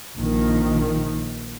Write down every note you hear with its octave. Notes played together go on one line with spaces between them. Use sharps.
A#1 D#3